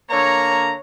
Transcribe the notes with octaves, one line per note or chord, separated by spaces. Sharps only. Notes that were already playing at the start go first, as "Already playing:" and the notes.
D3 A#3 C#5 A#5